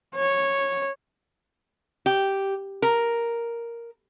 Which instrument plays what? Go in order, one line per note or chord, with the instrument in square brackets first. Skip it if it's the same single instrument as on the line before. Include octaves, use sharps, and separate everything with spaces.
[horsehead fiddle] C#5
[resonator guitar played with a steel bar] G4
A#4